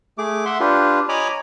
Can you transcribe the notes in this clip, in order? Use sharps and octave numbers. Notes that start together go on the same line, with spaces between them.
A3 G#4 D6
E5 F#5 C6
D4 F4 G4 B4
C#5 D#5 G#5 A#5 B5 D6